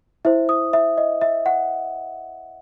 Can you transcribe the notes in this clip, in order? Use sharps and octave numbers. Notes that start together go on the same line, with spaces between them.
E4 C5 E5
D#6
E5
D#5
E5
F#5